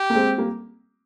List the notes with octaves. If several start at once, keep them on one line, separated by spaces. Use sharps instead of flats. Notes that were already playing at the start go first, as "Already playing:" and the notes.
Already playing: G4
A#3
G#3 C4
G3 A#3